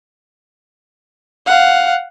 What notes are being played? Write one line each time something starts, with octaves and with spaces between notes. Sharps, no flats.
F5 F#5